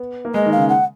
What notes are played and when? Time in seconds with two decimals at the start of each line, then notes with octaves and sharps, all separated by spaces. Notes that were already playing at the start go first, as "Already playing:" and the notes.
Already playing: B3
0.25 A#3
0.34 G#3 D#5
0.46 D#3
0.52 F5
0.58 C#3
0.69 F#5